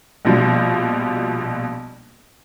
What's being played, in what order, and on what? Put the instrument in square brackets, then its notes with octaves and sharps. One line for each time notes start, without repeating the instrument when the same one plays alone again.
[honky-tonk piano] A#1 B2 F3 G3